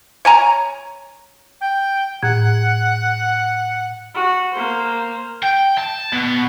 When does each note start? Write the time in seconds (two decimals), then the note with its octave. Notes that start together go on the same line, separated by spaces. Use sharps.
0.25 C#5 G#5 A#5
1.61 G5
2.23 A2 F#5 G#6
4.15 F#4
4.53 A#3 C5
5.43 G5
5.78 A5
6.13 B2